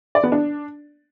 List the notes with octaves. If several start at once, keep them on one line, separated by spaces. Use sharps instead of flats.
D5
B3
D4